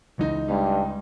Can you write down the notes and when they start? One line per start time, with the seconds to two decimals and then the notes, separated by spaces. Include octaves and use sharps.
0.19 C#2 E3 D#4 D#5
0.48 G2 G3 G#3 C#4